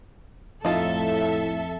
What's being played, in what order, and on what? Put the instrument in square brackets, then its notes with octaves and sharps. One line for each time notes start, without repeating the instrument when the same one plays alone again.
[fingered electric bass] F2 [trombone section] A2 [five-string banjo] D#4 F4 A5 [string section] A4 E5